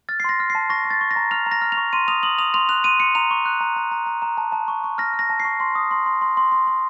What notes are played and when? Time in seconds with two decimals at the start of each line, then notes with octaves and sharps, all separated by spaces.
0.09 F6 A6
0.20 C7
0.24 C6 A#6
0.40 F6
0.50 C7
0.55 A5
0.70 C#6 A#6
0.85 C#6
0.90 A6
1.01 C#6
1.11 A#6
1.16 A#5
1.31 F6 F7
1.46 A#5
1.52 A#6
1.62 F6
1.72 F7
1.77 C#6
1.93 C6 D#7
2.08 D#6 F7
2.23 D#6 F#7
2.38 D#6 F7
2.54 C6 F7
2.69 F#6 F7
2.84 C6 D#7
3.00 C6 C#7
3.15 A#5 F7
3.31 C#6
3.46 F#6
3.61 A#5
3.76 A#5
3.91 A#5
4.06 A#5
4.22 A#5
4.37 A5
4.52 A5
4.68 C#6
4.84 C#6
4.98 F6 A#6
5.14 F6
5.19 A#6
5.30 A5
5.40 C7
5.45 C#6
5.60 C6
5.75 D#6
5.91 C6
6.06 C6
6.21 C6
6.37 C6
6.52 C6
6.67 C6